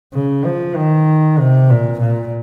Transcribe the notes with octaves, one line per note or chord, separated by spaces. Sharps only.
C#3
F3
D#3
C3
A#2
A#2